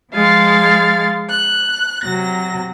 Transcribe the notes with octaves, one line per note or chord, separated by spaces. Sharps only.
F3 G#3 F5 A6
F#6
C3 F#3 A#6